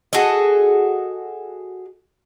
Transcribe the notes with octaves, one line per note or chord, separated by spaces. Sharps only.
F#4 G#4 A4 D#5